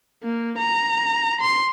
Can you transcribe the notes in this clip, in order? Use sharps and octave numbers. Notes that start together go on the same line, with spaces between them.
A#3
A#5
C6